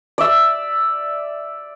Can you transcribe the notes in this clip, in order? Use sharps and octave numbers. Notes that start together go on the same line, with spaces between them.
D5 E5